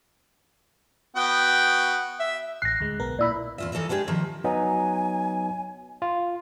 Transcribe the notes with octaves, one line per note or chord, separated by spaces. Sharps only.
B3 F#4 G5
E5
A1 F#6 A#6 C7
D2 G#3
B1 B3 A#4
A#2 E4 D5 B5 E6
E2 F4 E5
D#3 E3 A4 A#4 D#5 E5
G#3 B3 D4 G4 G#4
D#3 F3 A#3 E5
F#3 B3 D#4 G#5
F4